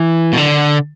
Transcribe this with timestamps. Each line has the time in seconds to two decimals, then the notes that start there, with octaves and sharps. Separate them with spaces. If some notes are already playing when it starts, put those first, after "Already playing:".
Already playing: E3
0.33 B2
0.37 D3